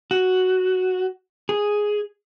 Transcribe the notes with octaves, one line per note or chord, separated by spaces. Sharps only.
F#4
G#4